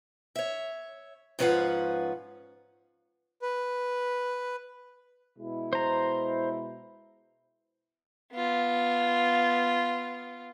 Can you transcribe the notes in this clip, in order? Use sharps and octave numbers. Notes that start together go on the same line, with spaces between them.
C#5 E5
G#2 F3 C#4 B4 F5 F#5
B4
B2 G#3 E4
C5 A#5
B3 F4